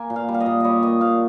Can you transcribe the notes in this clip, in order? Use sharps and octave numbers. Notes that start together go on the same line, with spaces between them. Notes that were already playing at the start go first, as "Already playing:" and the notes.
Already playing: A#3 G#5
A#2
F5
G3
F5
D#5
A#2
G3 C#5 D#5
A#2 D#5
A#2 F5